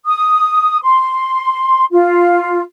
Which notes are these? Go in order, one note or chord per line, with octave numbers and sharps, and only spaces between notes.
D#6
C6
F4